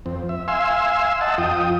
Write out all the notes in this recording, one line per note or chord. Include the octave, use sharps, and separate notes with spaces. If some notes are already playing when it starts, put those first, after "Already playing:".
F2 C4
E5
E5 F5 G#5 C6 E6
D#5 F#5 A5 E6
F2 F4 G5 D#6